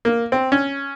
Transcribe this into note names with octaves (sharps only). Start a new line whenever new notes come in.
A#3
C4
C#4